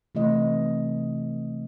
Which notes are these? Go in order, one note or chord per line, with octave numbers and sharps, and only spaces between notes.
C3 E3 A3 D#5